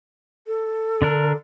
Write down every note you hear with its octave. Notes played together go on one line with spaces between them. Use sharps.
A4
D3 D4 A#4